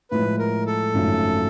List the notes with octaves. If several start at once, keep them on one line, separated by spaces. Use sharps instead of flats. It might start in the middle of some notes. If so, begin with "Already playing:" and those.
A2 F3 G#3 B4
A#4
A4
G#1 F#2 C#3 F3 A3